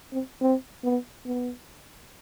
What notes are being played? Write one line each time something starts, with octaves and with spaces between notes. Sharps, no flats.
C4
C4
B3
B3